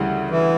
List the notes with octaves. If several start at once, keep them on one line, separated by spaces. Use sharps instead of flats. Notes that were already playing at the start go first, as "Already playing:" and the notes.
Already playing: D2 C#3 E3 G3
E3